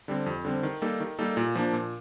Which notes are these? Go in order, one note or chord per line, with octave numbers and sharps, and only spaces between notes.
D3 G3 C4
F2
D3 G3 C4
D#3
G3 A#3 D#4 A4
D#3
G3 A#3 D#4 A4
A#2
F3 A#3 D4
A#2